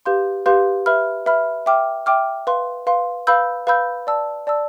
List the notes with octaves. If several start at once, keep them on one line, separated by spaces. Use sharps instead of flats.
G4 B4 F5 C6 G6
G4 B4 F5 C6 G6
B4 E5 B5 F6
B4 E5 B5 F6
E5 G5 D6 F6
E5 G5 D6 F6
B4 F5 C6
B4 F5 C6
B4 F5 B5 E6 G6
B4 F5 B5 E6 G6
D5 A5 E6
D5 A5 E6